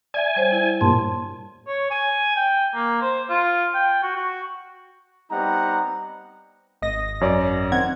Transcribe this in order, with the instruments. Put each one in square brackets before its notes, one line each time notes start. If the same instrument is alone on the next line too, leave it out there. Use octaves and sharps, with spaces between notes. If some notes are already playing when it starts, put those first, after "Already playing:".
[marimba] D5 E5 [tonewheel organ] G#5
[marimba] G3 C5 C#5
E4
[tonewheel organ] G2 A#2 [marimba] A5 C6
[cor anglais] C#5
G#5
G5
A#3
C5
F4
G5
F#4
F#4
[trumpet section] G3 B3 C4 D#4 F#5 A#5
[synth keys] G#1 D#5 A#6
[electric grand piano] F#2 C#5 D5
[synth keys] D#3 C4 G#6 [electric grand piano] F#5